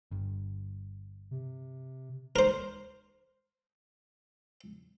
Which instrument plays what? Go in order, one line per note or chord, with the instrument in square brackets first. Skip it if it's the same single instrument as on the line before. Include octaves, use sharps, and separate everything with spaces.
[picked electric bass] G1 G2
[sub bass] C3
[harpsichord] A#4 C5